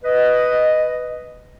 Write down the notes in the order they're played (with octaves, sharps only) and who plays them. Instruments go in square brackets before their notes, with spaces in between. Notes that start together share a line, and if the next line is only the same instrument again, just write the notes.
[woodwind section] B4 D#5